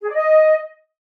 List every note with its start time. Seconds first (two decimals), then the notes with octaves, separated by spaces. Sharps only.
0.02 G#4
0.08 D5
0.14 D#5